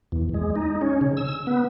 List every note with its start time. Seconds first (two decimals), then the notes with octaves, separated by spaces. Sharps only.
0.12 E2
0.34 G#3
0.56 D#4
0.81 C#4
1.01 C#3
1.17 E6
1.47 B3